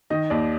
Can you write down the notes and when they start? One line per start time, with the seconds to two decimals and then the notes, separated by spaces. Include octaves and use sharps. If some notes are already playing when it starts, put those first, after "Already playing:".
0.10 D#3 D#5
0.30 D#2 D5